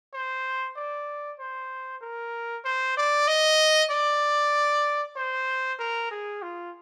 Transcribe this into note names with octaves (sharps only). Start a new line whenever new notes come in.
C5
D5
C5
A#4
C5
D5
D#5
D5
C5
A#4
G#4
F4